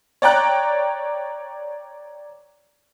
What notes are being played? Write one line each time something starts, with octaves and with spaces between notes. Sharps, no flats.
C#5 D5 G5 A#5 F#6 A6